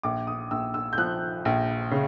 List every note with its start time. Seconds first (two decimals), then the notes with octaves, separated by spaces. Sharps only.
0.03 A#1 D6
0.27 D#6
0.51 A#1 E6
0.74 E6
0.93 G6
0.98 F3 F#6
1.45 A#1
1.91 C#3